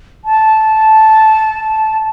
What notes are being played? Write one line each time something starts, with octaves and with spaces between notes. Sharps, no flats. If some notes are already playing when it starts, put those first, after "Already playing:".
A5